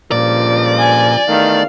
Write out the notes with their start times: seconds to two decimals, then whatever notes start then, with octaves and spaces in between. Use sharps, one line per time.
0.12 C#2 G2 A#2 F3 D5
0.79 G#5
1.29 E2 D#3 A3 F5